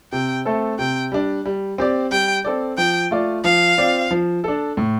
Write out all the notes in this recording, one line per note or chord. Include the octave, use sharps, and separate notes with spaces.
C3 G5
A3 C4 A4
C3 G5
G3 D4
G3
C4 G4 D5
G3 G5
C4 A4 D5
F3 G5
A3 F4 D5
F3 F5
C4 F4 D5
F3
D4 A4
A2